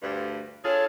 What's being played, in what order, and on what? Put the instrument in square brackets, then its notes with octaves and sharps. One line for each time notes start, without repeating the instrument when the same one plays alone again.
[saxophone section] D2 G2
[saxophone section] D4 G#4 [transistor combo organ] F4 A4 [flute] C#5